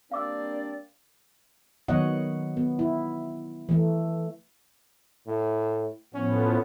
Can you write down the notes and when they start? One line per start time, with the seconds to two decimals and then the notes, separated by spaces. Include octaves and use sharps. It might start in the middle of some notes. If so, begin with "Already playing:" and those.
0.11 G3 A#3 C4 D4 D5 F5 D6 E6
1.88 D#3 F#3 B3 C#5 D#5 F#5
2.57 B3
2.79 E4
3.69 E3 A3
5.27 A2
6.14 A2 F3 B3 C#4